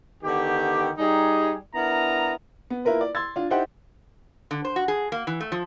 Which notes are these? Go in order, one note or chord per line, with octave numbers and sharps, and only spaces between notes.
D3 D#3 B3 G4
G3 D#4 G#4
B3 D4 E4 A#4 A#5
B3
A#3 E4 F4 A#4 B4
D5
C6 E6 G#6 A6
D4 F4
D#4 E4 G4 C5 F#5 G5
D3
C5
F#4
G#4
A#3
E3
A3
F3